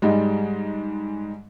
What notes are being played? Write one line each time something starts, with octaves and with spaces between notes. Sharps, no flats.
G#2 G3 G#3